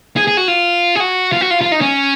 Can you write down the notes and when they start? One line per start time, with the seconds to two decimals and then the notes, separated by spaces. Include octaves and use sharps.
0.17 G#4
0.27 G#4
0.37 F#4
0.48 F4
0.95 G#4
1.00 F#4
1.32 F4
1.41 F#4
1.51 F4
1.61 F4
1.72 D#4
1.81 C#4